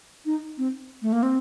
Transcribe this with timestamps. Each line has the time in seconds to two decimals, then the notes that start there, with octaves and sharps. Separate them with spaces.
0.26 D#4
0.58 C4
1.02 A3
1.13 A#3
1.23 C4